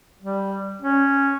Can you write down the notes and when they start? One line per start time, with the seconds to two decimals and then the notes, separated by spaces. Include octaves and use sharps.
0.22 G3
0.82 C#4